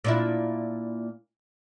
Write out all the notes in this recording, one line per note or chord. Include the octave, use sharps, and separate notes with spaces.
A#2 D4 E4